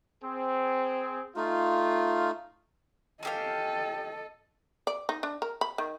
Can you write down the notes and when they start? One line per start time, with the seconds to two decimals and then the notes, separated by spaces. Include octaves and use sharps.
0.23 C4 G#4
1.36 A3 D#4 F4
3.23 C#4 G4 A4 D#5 F5
4.87 D5
5.09 D#4
5.23 D4
5.42 A#4
5.61 B5
5.78 D#3